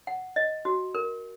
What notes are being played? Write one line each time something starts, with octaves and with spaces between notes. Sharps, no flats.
F#5
D#5
F#4
A#4